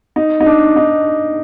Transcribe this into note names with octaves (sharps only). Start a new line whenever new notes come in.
D#4
D#4
D4
D#4